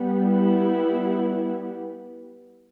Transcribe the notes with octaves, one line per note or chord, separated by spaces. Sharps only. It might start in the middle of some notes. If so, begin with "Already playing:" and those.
Already playing: G3 B3
E4